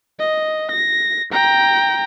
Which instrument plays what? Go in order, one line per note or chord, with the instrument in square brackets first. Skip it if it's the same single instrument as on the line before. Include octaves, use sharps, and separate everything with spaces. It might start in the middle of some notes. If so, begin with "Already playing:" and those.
[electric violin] D#5
A#6
G5 A#5